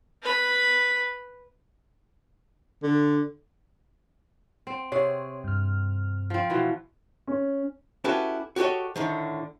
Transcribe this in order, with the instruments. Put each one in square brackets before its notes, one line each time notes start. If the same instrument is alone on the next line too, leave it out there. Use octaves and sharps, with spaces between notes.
[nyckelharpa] B4 B5
[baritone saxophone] D3
[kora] C4
[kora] C3 G#4 [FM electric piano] C#5
[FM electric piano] G2 F6
[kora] F3 C4
B2 E3 F3
[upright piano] C#4
[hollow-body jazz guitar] C#4 E4 F#4 G4 A4 B4
F#4 G4 A4 C#5 D#5
A2 D3 D#3